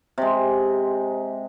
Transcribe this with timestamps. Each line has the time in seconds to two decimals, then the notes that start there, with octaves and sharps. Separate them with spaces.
0.18 C3 G#3